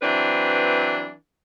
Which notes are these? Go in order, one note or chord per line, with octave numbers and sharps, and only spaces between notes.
E3 F#3 C4 D4 B4 E5